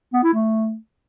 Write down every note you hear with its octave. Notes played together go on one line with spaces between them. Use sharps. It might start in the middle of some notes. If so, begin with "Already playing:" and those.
B3
E4
A3